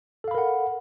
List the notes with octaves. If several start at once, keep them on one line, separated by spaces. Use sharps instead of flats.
A4 A#4 F5 F#5 B5